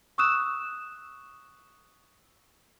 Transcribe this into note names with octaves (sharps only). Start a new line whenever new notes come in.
C#6 D#6 E6 F#6 E7